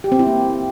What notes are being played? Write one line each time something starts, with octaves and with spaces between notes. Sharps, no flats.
G4
C4
E4
A#3